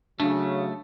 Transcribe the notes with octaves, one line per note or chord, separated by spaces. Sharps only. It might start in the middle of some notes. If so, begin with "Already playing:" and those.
C#3 F#3 A3 D4